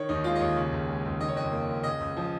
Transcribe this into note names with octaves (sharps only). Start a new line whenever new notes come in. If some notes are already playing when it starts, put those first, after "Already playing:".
Already playing: D#3 C#5
D#2 D#4
G#3 F4
D#5
D#2 C#5
C#3
C#2
G#3
C#2
D#3 D#5
C#5
F2 D#5
A#3
F2
C#3 D#5
C#2
F3